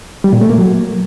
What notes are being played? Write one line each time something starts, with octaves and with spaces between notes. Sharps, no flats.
G3
A#2
A3
A#3
F#3